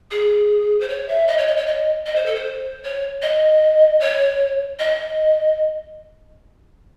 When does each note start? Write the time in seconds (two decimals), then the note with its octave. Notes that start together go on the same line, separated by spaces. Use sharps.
0.11 G#4
0.80 C5
0.89 C#5
1.09 E5
1.27 D#5
1.38 C#5
1.47 D#5
1.57 C#5
1.67 D#5
2.06 D#5
2.16 C5
2.26 A4
2.35 C5
2.84 C#5
3.22 D#5
4.00 C#5
4.79 D#5